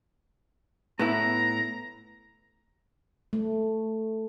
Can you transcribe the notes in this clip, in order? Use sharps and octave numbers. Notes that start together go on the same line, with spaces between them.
A2 B3 E4 A#5
A3